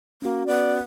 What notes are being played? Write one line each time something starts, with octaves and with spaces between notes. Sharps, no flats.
A#3 C#4 F#4
B3 D5